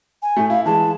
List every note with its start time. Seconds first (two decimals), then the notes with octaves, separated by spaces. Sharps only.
0.23 G#5
0.37 A2 A3
0.50 E4 F5
0.66 E3 G#3 A5